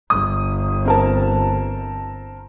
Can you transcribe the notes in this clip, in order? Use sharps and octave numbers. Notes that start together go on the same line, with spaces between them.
G1 D#6
C4 A#4 A5